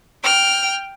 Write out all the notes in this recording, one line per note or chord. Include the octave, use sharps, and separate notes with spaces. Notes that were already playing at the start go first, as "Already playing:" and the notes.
G5 F6